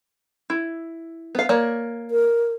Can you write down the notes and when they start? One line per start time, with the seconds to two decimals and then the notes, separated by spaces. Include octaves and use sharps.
0.50 E4
1.35 B3 F5
1.49 A#3 C#5 D5
2.11 A#4